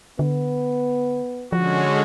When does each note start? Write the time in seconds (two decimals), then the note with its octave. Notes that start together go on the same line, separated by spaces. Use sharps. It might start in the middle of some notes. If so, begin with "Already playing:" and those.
0.19 D3 B3
1.52 D3 F3 G#3 C#4 F#4